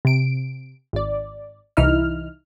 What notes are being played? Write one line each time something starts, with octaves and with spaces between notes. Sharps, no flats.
C3 D7
G#1 D5
C2 E3 D#4 E4 F6